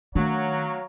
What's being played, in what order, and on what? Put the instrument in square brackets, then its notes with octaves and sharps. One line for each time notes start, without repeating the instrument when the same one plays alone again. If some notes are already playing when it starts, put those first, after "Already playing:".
[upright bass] D#3 [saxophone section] F#3 [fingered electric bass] A3 D4 [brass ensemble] C#5 F5 A#5